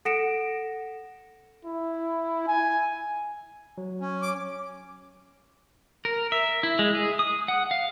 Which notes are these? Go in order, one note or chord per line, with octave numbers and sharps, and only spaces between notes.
A4 F#5 A#6 C#7 D7 E7
E4
G#5
F#3
C#4
D6
A#4
E5
E4
G#3
G#4
D#6
F#5
F5